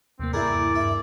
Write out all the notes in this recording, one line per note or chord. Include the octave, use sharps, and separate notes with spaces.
D#2 C3 A#3 C4
G2 E4 G#4 A#4 D5
E5